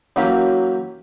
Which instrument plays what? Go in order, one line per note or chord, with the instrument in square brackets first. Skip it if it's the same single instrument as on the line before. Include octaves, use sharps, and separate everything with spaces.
[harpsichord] F#2 E3 F#3 A#3 G4